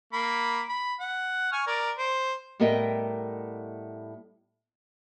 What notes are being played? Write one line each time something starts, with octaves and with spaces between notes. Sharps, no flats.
A#3 B5
B5
F#5
G#5 C#6 F6
A#4 D5
C5
A2 G3 B3 A#4 D#5 G5